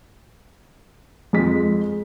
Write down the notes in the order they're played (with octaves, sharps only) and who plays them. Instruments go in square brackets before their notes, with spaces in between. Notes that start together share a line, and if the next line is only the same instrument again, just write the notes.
[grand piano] F2 G#3 B6